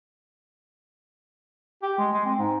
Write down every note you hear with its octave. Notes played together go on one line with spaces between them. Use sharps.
G4
G#3
G#3
C4
G#2